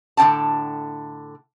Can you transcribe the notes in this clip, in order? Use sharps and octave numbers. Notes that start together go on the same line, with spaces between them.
A2 D3 D#4 G5 A5